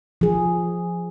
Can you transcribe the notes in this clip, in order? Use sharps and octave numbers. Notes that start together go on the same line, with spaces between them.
F3 G#4